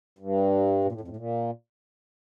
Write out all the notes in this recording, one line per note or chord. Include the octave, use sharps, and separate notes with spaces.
G2
A#2
A2
F2
A2
A#2